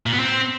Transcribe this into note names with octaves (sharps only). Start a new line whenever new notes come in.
A#2
B3
C4